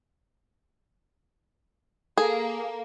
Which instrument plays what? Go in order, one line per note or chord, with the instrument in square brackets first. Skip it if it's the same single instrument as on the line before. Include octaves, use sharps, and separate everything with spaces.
[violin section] A#3 [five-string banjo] G#4 [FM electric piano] A4